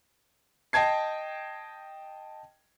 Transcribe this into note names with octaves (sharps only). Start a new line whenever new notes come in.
D#5 G5 A5 G#6 C7